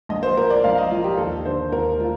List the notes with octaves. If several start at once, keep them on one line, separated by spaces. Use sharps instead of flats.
A#1 D#5
C5
A#2 A#4
D5
A#1 F5
D#5
F3 F4
G4
D#2 A4
D3 C5
D#2 A#4
A3 F4